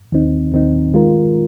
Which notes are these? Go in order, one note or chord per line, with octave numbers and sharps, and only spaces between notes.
D#2 D#3 C4 D#4
D#2 D#3 C4 D#4
D#3 G#3 F4 A#4